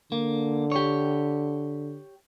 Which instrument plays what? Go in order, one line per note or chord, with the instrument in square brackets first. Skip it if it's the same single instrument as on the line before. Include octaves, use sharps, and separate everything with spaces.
[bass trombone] D3 [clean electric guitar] A#3
[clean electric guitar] G4 C#5